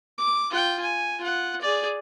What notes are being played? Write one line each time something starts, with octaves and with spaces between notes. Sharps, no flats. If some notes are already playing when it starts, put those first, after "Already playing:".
D6
F4 G5
G#5
F4 F#5
G#4 D5